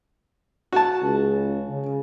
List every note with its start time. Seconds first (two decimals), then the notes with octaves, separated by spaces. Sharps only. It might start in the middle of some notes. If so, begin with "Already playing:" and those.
0.73 F#4 A5
1.02 C#2 C#3
1.68 C#3